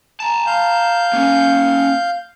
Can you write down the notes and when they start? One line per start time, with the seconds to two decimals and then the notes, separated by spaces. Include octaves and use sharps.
0.20 A5 A#5
0.46 F5 G6
1.13 A#3 C#4